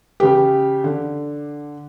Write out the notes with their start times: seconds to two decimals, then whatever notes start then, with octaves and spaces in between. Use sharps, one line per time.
0.20 C#3 G4
0.84 D3